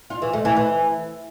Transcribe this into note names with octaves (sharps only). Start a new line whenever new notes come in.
F4
E3
A3
E3
E3